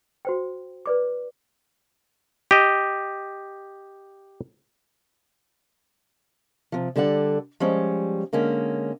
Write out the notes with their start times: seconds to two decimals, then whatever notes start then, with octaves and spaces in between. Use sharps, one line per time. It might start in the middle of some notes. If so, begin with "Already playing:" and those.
0.25 F#4 C5 G5
0.86 B4 D5 D6
2.51 G4 D#5
6.72 C3 F3
6.96 D3 G3 A4 D5 F#5
7.60 F3 G3 G#3 C#4
8.33 D3 G#3 A#3 C#4